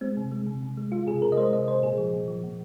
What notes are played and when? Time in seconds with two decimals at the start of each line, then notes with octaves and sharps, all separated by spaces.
0.01 G#3 C4
0.17 C3
0.31 G#3
0.47 C3
0.63 C3
0.77 G#3
0.92 G#3 F4
1.07 C3 G#4
1.22 C3 A#4
1.32 D#5
1.37 G#3 C5
1.52 C3 D#5
1.68 C3 C5
1.82 A#2 G#4
1.98 F3
2.13 A#2
2.28 F3
2.43 A#2